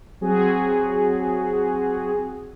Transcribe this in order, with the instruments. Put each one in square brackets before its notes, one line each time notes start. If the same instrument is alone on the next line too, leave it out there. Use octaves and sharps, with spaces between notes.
[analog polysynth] F#3 C4 F#4 G#4